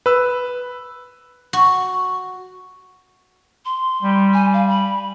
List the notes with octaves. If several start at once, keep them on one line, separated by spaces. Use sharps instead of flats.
B4 E6
F#4
C6
G3
G#5
F5
B5